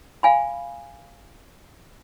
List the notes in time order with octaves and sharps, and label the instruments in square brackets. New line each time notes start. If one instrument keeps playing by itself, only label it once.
[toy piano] F5 G#5 B5